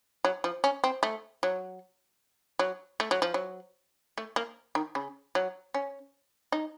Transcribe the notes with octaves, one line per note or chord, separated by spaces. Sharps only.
F#3
F3
C#4
C4
A3
F#3
F#3
A3
F#3
F3
F#3
A3
A#3
D#3
C#3
F#3
C#4
D#4